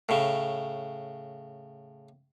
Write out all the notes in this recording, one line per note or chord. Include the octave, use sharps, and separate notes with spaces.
A2 C#3